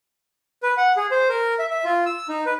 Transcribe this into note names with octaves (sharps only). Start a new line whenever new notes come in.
B4
F#5
G#4
C5
A#4
E5
E5
F4
E6
D#4
B4